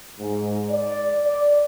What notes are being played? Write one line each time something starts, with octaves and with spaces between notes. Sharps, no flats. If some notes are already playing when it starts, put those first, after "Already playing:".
G#2
D5
D5